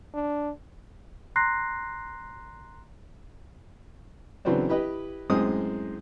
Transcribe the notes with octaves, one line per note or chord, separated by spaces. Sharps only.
D4
A#5 C6 F#6 A#6 C7
C#3 E3 F#3 B3 C4 D4
E4 G4 B4 D#5
F#2 A2 G#3 C4 D#6